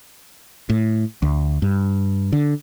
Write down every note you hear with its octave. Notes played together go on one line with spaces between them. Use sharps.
A2
D2
G2
D3